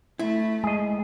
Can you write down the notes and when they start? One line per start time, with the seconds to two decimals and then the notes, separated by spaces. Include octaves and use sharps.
0.19 A3 E4
0.64 G#3 G#4 D#5